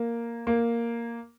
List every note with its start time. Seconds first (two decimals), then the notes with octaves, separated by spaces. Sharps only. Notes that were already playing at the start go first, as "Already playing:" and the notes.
Already playing: A#3
0.47 A#3